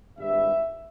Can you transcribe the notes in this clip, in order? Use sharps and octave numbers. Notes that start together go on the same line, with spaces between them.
G#1 G2 G3 E5